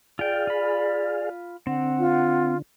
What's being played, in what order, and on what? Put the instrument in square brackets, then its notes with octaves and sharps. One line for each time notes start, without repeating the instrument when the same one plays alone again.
[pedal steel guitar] F4 G5 [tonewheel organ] G#4 F5 [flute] D5
[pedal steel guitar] F4 B5
[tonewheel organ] D3 [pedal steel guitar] C4 [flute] F#5
[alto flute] F4